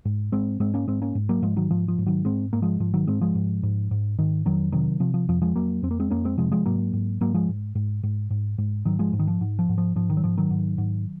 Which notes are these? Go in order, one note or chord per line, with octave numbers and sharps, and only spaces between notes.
G#2
G#2 G#3 C4
G#2 G#3 C4
A#3 C#4
G#2 G#3 C4
A#3 C#4
G#2
F#3 A#3
G#2 F3 G#3
D#3 F#3
G#2 F3
F3
G#2
D#3 F#3
G#2 G#3 C4
G#2 A#3
F3 G#3
G#2 F3
D#3 F#3
G#2 G#3 C4
F3 G#3
G#2
G#2
G#2
G#2 D#3
F2 D#3 F#3
C3 D#3 F#3
C3 F3
F3
F2 F3
F3 G#3
F2 F#3 A#3
F2 C4
A#3
G#3 C4
F2 A#3 C#4
G#3 C4
C3 F3 G#3
F3 G#3
G#2 F#3 A#3
G#2
G#2 F#3 A#3
F3 G#3
G#2
G#2
G#2
G#2
G#2
G#2 D#3 F#3
F3 G#3
G#2
D#3
F3
G#2
F3
G#2
F3
G#2 F3
D#3
F#3
G#2 F3
D#3 F#3
G#2
G#2